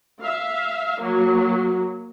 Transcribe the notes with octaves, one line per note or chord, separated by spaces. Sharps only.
E5 F5
F#3 A#3